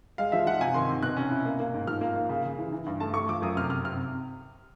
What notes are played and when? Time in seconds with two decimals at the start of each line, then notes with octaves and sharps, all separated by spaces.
0.18 G#3 F5
0.32 F3 E5
0.46 F3 F#5
0.61 C3 G#5
0.74 D#3 C6
0.89 C3
1.03 B2 F#6
1.17 C#4
1.31 E4
1.45 A#3
1.60 A#3
1.74 G#2
1.87 F3 F6
2.01 A#3
2.16 A#3
2.29 C#3
2.44 C#3
2.59 E3
2.72 E3
2.86 G2
3.00 A3 A5
3.14 A3 C#6
3.29 F3 D6
3.42 F#2 D#6
3.57 C3 F6
3.70 C3 F6
3.84 C3 F6